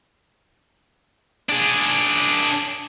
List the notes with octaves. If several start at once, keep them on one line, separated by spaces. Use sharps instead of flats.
D4 G#4